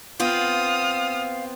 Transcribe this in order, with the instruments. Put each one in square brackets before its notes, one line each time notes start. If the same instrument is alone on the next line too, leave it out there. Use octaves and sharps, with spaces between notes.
[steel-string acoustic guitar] B3 C4 F4 [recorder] F5 [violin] D#6 F6